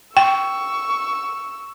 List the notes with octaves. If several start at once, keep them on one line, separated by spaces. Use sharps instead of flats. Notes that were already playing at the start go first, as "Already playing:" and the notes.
G5 C#6 E6